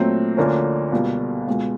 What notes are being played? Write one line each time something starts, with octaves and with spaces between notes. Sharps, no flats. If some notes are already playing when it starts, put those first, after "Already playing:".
Already playing: A#2 F#3 A3 C4
D2 D3 F3 A#3 C#4
C#2 B2 G3 A#3
C#2 B2 G#3